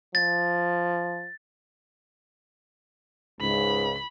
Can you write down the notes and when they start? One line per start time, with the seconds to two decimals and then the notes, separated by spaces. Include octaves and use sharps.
0.15 F3 A6
3.40 C#2 G#2 B5